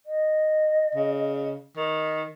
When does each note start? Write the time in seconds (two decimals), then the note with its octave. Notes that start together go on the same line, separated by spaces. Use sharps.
0.06 D#5
0.95 C#3
1.77 D#3